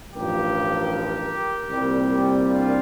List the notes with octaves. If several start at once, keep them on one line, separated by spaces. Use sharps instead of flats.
A1 G2 F3 G4 A#4
C2 A#2 G3 C4
D4 F4